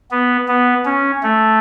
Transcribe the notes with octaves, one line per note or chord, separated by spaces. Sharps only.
B3
B3
C#4
A3